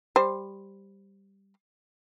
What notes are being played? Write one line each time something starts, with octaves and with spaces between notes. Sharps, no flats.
G3 C5